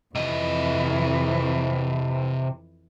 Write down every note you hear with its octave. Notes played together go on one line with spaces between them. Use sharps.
F2 C3 E3 D#5